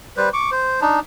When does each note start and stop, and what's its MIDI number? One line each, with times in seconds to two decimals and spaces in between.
0.17 0.29 55
0.17 0.29 71
0.17 0.29 72
0.33 0.50 85
0.33 0.50 86
0.52 0.80 72
0.81 1.00 62
0.81 1.00 63